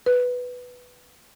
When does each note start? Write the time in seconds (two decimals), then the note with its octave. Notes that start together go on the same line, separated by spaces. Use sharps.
0.06 B4